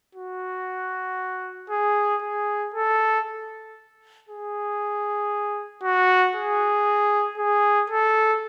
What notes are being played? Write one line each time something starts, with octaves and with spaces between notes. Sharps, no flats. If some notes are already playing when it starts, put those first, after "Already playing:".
F#4
G#4
G#4
A4
G#4
F#4
G#4
G#4
A4